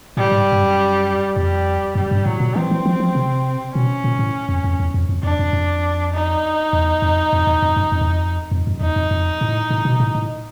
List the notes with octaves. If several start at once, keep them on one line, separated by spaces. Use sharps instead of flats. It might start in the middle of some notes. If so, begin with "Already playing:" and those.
A2 G3
G#2
G2
F#2
F2 G3
F#2 G3
G2
A2 F#3
A#2
E3 C4
E3
F3
F3
C3
B2 C#4
A#2
A2
F2
F2
E2
F2
F2
F2 D4
F2
F2
D#4
E2
F2
F2
E2
F2
F#2
F2
E2
F2
F2
F#2
E2 D#4
F2
F2
A2
A2
B2
A2
A2